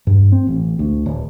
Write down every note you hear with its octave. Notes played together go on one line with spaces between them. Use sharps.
G2
C4
A1
D2
D1